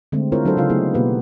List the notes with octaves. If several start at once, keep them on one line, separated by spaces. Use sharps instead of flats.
D3 G#3 A3 C4
C4 E4 F4 A#4 C5 C#5
F#3 D4 F#4 A4 C5
C#3 D#4 F4 F5
F#3 A3 B3 D#4 E4 G#4
B2 A#3 B3 G4 B4